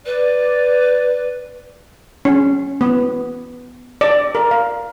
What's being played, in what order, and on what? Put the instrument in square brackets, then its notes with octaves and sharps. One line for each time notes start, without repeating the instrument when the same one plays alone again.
[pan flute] B4 [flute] D5
[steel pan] C#4
B3
D5
A#4
F5